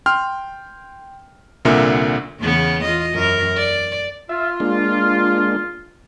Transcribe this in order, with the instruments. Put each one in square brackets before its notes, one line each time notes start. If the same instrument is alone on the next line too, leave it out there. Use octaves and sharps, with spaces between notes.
[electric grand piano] G5 C6 F6
C2 A#2 D3 A#4 E5
[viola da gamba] E2 C#3 B3
F4 D#5
F#2 A#4
D5
[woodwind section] F4 [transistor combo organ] E5
[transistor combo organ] G#3 A#3 D4